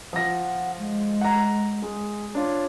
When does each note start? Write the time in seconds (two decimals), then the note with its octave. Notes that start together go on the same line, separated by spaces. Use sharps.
0.13 F3 F#5 A#6
0.79 G#3
1.21 F#5 A#5
1.82 G#3
2.35 D4 F4 C#5